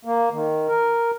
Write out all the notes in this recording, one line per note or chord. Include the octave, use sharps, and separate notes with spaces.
A#3
D#3
A#4